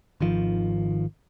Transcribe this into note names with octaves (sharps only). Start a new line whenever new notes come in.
G#1 D#3 F3